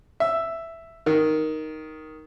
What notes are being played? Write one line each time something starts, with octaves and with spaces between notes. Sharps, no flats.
E5
D#3